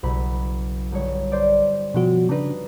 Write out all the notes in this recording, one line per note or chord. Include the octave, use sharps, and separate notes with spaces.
F#1 B1 E4 B5
G1 C#5
C5 D5
B2 F3 F#4
C#3 D4 D#4 B4